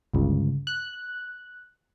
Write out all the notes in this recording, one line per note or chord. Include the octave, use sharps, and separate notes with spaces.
G1 C#2
F#6